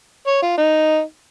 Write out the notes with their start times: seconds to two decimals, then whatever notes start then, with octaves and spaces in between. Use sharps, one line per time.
0.27 C#5
0.42 F4
0.58 D#4